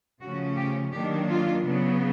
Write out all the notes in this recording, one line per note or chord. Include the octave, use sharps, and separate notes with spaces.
C#3 F3 A3 C#4 F#4
G4
D#3 F#3 A#3 D4 G4
F4
C#3 F#3 B3